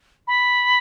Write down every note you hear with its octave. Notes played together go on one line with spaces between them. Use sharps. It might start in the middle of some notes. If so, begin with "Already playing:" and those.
B5